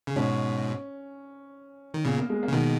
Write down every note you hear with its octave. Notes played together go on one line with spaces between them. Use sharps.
C#3
G#2 B2 C#4
D#3
A#2 C#3 B3
A#3
G#3
A#3
C#3
B2 D#3